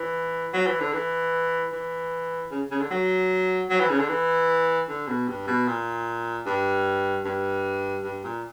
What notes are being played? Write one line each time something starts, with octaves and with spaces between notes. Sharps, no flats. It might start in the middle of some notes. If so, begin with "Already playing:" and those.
Already playing: E3
F#3
E3
D3
E3
E3
C#3
C#3
D3
F#3
F#3
E3
C#3
D3
E3
D3
B2
G2
B2
A#2
G2
G2
G2
A#2